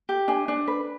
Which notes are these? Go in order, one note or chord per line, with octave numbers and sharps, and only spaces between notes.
G4
D4 G#5
D4
B4